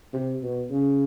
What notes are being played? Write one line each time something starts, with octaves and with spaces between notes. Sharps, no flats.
C3
B2
C#3